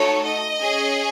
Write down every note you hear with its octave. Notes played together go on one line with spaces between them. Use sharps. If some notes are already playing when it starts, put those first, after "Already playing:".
Already playing: A3 D#4 F#4 A4 C#5
D#5
C#4 G#4